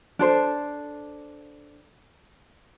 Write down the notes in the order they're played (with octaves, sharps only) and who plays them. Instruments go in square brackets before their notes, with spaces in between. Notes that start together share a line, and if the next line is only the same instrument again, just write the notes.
[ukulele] D4 A4 C5